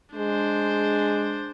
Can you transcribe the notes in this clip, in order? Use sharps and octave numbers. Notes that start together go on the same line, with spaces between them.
G#3 D4 C5